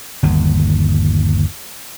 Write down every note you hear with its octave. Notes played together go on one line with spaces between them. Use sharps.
G1 D#2